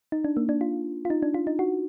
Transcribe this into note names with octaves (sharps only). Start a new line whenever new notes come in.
D#4
D4
A#3
D4
F4
F4
D#4
D4
F4
D#4
F#4